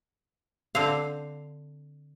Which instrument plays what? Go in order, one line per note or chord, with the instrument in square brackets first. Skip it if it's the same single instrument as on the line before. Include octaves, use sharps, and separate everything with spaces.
[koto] D3 C4 F5